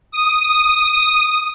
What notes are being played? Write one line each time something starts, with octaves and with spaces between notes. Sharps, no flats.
D#6